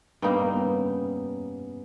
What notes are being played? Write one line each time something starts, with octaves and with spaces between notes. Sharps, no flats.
G2 G3 A#3 B3 D#4
B3
B3
C#4